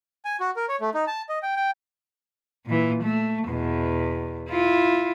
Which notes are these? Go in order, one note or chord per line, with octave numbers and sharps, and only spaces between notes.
G#5
F#4
A#4
C#5
A3
D#4
A5
D#5
G5
G5
A#2 E3
A3
E2 B2
E4 F4